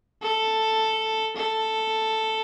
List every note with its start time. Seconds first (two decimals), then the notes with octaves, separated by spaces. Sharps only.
0.22 A4
1.36 A4